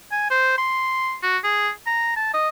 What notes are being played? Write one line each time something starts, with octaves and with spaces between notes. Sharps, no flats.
G#5
C5
C6
F#4
G#4
A#5
A5
D#5